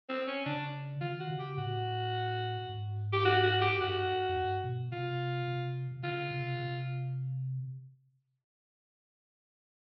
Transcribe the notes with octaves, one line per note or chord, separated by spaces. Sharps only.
C4
C#4
C#3 D4
D#3 F4
F#4
C#3
G4
A2 F#4
G#2
G4
F#4
F#4
G4
G2 F#4
F#2
G2
B2
C3 F4
C3
C3
C#3 F4
C3
C3